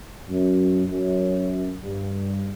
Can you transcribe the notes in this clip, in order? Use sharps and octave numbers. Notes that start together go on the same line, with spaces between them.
F#2
F#2
G2